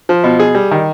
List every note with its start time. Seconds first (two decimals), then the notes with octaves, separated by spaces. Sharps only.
0.09 F3
0.24 B2
0.40 G#4
0.55 G3
0.71 D#3